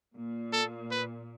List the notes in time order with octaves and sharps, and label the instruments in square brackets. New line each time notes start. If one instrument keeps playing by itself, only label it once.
[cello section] A#2
[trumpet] A4
B4